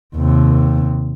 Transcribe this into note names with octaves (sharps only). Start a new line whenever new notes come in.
D#2 C3